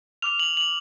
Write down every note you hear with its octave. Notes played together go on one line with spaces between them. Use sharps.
D6 F6 F7
F#7
F#7